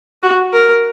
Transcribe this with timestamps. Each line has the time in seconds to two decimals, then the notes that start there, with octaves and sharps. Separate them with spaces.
0.23 F#4
0.53 A#4